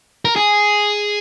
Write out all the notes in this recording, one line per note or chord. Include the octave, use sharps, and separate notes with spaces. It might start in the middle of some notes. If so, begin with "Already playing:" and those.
A#4
G#4